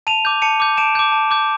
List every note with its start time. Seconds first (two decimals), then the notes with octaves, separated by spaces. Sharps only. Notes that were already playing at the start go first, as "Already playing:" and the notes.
0.07 A5 D#7 F7
0.25 D6 G6
0.42 A5 C#7 D#7
0.60 D6 G6
0.77 A5 D7 E7
0.95 D6 G6
1.12 A5
1.31 D6 G6